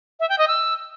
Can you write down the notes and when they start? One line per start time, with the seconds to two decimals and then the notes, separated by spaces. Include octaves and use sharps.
0.20 E5
0.29 G5
0.38 D#5
0.48 E6